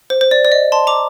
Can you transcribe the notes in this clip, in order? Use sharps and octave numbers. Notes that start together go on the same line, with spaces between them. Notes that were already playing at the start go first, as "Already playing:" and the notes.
C5
C5
D5
D5
D#5
A5 C6
A#5 D6